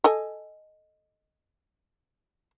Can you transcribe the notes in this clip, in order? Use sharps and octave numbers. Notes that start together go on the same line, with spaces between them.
A4 D#5 G#5